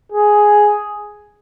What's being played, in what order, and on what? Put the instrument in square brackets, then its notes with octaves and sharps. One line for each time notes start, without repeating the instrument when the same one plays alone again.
[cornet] G#4